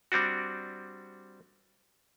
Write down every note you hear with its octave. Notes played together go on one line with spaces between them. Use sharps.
G3 C4 D4 F#4